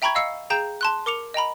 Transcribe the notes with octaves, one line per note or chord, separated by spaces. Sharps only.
E5 G5 A#5 B5 C#6 G#6
D#5 F5 E6 C7 C#7
G#4 F5 G5 A#5 G6 E7
A5 C6 F#6
A#4 D6 C#7 F7
D#5 G5 A#5 B5